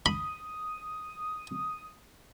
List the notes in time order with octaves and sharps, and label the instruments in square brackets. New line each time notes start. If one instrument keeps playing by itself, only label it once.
[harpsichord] B5 [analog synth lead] D#6